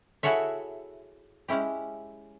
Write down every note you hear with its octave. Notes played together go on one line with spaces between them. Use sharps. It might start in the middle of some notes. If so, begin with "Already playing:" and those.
E4 F#4 G#4 A4 C#5 E5
G#3 C#4 E4 G4